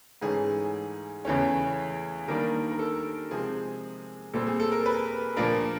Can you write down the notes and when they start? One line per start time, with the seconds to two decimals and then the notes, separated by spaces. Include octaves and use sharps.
0.22 G#2 E3 A3 C#4 G#4
1.25 E2 C#3 E3 A3 C#4
2.28 D#3 G3 A#3 D4 A#4
2.71 A#4
2.79 A4
3.31 C3 F3 G#3 C4 G#4
4.34 A#2 G3 C4 A4
4.47 G#4
4.60 A4
4.72 A#4
4.86 B4
5.36 A#2 F3 A#3 D4 A#4